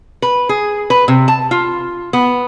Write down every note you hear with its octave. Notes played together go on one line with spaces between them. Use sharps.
B4
G#4
B4
C3
A5
F4
B3